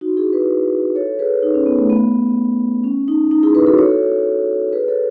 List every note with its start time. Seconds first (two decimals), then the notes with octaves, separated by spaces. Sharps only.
0.01 D#4 F#4
0.17 E4 G#4
0.33 G#4 B4
0.95 A4 C#5
1.19 G#4 B4
1.43 D#4
1.54 C#4
1.66 B3
1.78 A3
1.90 B3
2.84 C#4
3.08 D#4
3.31 D#4
3.43 E4 G#4
3.55 G#4 B4
3.66 F#4 A4
3.78 A4 C#5
4.73 G#4 B4
4.88 A4 C#5